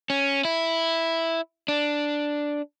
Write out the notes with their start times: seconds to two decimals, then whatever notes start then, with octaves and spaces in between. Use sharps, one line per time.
0.10 C#4
0.45 E4
1.68 D4